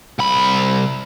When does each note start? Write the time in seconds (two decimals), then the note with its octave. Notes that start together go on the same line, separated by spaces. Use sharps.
0.19 C2 B5